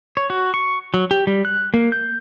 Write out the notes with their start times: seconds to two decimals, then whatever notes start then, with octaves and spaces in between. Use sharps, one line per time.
0.17 C#5
0.30 F#4
0.54 C#6
0.94 F#3
1.11 G4
1.27 G3
1.45 F#6
1.74 A#3
1.92 G6